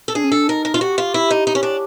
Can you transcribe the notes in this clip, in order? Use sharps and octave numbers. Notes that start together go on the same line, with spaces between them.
A4
D4 G#4
C#4
D4 A4
D#4 A#4
A#4
F4
F#4 G4
F4
E4
D#4
D#4
C#4
D4